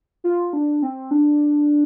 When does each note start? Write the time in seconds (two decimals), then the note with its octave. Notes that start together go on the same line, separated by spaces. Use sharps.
0.24 F4
0.53 D4
0.82 C4
1.11 D4